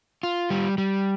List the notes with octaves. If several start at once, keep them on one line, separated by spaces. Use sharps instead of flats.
F4
G3
G3